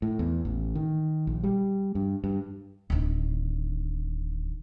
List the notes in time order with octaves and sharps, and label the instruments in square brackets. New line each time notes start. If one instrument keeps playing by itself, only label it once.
[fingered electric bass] A2
E2
A1
D#3
A#1
G3
G2
G2
[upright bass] D1 D#3